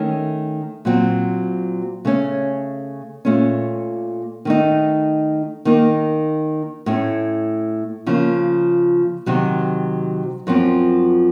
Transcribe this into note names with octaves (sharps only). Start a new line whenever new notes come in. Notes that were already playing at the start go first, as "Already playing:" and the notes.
Already playing: D#3 A3 C#4
A#2 F#3 C4
C#3 A3 C#4
A#2 A3 C#4
D#3 A3 D#4
D#3 A#3 D#4
A2 A3 C#4
C#3 F3 A#3
C3 D#3 F#3
F#2 F3 C4